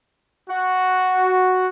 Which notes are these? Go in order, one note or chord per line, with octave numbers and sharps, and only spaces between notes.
F#4